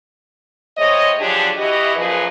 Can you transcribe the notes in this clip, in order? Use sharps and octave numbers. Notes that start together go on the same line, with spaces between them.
A2 G#3 C5 C#5 D#5
D3 F3 F#3 D4 G4 G#4
E3 E4 F#4 G4 D#5
F#2 A#2 F3 G#4 B4